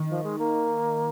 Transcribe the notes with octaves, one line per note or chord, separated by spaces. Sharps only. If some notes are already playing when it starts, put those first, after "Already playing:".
Already playing: D#3
F3
G#3
A#3